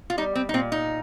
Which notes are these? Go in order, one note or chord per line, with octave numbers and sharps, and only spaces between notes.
F4
G3 D#4
C4
D#4
A#2 C4
D#4